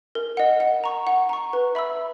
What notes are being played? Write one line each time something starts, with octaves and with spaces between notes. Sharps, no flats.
A#4
D#5 F#5
F#5
A#5 C#6
F#5
A#5 C#6
B4
E5 B5 E6